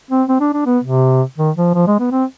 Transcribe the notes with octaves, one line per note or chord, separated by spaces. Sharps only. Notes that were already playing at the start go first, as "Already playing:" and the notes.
C4
C4
D4
D4
B3
C3
D#3
F3
F3
G#3
B3
C4